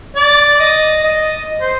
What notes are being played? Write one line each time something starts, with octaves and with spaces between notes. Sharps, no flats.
D5
D#5
D#5
C5